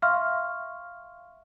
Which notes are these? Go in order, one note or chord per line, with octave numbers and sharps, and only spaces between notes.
E5 F5 C6 C#6 F6